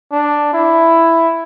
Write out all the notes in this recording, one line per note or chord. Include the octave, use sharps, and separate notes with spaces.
D4
E4